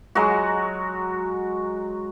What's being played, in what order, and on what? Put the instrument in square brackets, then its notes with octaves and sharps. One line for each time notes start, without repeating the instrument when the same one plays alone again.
[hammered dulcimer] F#3 G#3 F#4